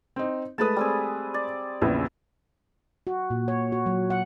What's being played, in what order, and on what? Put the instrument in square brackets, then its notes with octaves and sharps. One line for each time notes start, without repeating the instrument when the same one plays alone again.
[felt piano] C4 D#4
[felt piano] G#3 A3 B4 [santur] A5 B5 D#6
[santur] G3 C4 G#4
D5
[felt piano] A#1 E2 C#3 [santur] E4
[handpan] F#4
A#2
C#5
F#4
F#3
F#5